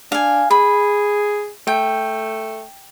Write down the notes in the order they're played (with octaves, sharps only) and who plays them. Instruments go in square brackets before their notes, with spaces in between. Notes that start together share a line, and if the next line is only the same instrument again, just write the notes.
[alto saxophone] D4 [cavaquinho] F5 G#5
[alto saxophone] G#4 [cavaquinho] B5
[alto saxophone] A3 [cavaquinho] G5